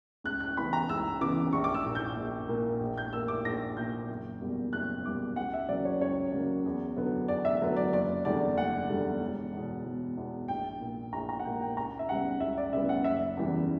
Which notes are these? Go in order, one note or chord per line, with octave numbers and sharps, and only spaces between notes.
C#2 F#6
F#6
C#3 E3 B3 B5
A#5
C#2 E6
C#3 E3 B3 D6
A#1 C#6
D6
E6
A#2 A#3
G6
A#1
A#2 A#3
A#1
G6
A#2 A#3 E6
D6
A#1 A#6
A#2 A#3 G6
F#1
E2 B2 G3 A#3
F#1 F#6
E2 B2 G3 A#3 D6
C#2 F#5
E5
C#3 F#3 A#3 D5
C#5
C#2 C#5
C#3 F#3 A#3
E2
D3 F#3 B3
E2 D5
E5
D3 F#3 B3
D5
F#1 D5
E2 D3 G3 D5
F#1 F#5
E2 D3 G3
E1
E2 B2
E1
E2 B2
A#1 G5
A#2 A#3
A#1 A#5
A#5
F#5
A#2 A#3 G5
G5
C#2 A#5
E5
C#3 G3 B3 F#5
C#2 E5
D5
C#3 G3 B3 E5
F#5
F#1 E5
E2 C#3 E3 G3